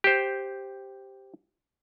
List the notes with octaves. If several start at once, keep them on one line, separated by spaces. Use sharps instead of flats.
G4 C5